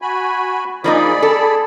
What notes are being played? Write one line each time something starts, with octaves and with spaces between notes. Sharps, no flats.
F#4 G#5 B5
F3 A#3 D#4 G#4 D5 B5
A4